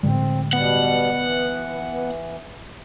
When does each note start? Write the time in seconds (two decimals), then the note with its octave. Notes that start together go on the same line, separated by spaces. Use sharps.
0.03 A2 D3 G#3 C4
0.53 B2 G3 B3 F#5
1.17 E3